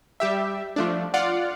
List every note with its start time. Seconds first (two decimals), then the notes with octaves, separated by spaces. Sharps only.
0.20 G3 G4 E5
0.76 F3 A3 D4
1.14 F4 D5 F5 F#5